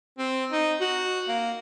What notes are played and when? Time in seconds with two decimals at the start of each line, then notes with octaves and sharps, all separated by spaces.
0.18 C4
0.52 D#4
0.81 F#4
1.28 A#3